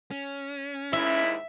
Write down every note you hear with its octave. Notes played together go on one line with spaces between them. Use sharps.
C#4
D#2 G#2 E4 E5